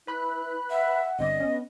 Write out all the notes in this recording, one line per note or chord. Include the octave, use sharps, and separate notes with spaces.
E4 B4 B5 F#6
E5 F#5
G1 C4 D5 D#5
B3 C#4